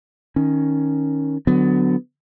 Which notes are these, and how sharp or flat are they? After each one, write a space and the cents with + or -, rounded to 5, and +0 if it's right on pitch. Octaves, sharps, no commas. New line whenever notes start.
D#3 +0 C#4 +0
D3 +15 F#3 +0 B3 +25